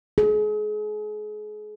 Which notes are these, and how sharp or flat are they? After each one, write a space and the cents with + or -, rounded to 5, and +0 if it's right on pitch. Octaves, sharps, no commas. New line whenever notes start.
G#4 +35